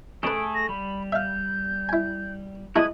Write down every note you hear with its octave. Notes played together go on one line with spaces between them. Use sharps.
A3 C#4 G#4 A4 B4 D7
A#6
G3 B5
E5 F5 G6
E4 G#5
G#3 D4 E4 F#4 B4 D#6 G#6